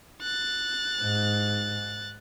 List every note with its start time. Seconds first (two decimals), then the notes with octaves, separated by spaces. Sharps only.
0.22 F#6 A6
1.02 G#2